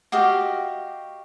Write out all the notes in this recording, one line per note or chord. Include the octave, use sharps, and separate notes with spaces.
F#4 G4 D#5 F5